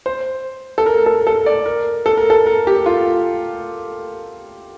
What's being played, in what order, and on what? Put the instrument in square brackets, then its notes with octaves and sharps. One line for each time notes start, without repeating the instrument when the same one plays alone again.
[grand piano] C5
A4
A#4
A4
A4
D5
A#4
A4
A#4
A4
A#4
G4
F4